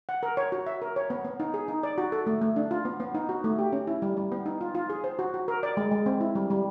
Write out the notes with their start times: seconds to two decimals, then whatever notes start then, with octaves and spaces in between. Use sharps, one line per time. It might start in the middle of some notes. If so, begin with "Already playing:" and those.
0.09 F#5
0.23 A#4
0.37 C#5
0.52 F#4
0.67 E5
0.82 A#4
0.96 C#5
1.10 B3
1.25 B3
1.40 D#4
1.54 G#4
1.68 D#4
1.83 D5
1.98 F#4
2.12 A4
2.27 A3
2.41 A3
2.56 D4
2.71 F4
2.85 B3
3.00 B3
3.14 D#4
3.29 F#4
3.44 A3
3.59 G4
3.72 C#4
3.87 E4
4.02 G3
4.17 G3
4.32 B3
4.46 D#4
4.61 F4
4.75 F4
4.90 G#4
5.04 C5
5.19 F#4
5.34 F#4
5.48 A#4
5.63 D5
5.77 G#3
5.91 G#3
6.06 C4
6.21 E4
6.35 G3
6.50 G3